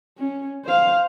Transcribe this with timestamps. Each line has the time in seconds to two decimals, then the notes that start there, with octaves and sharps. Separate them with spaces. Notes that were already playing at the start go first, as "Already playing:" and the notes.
0.18 C#4
0.65 C5 F5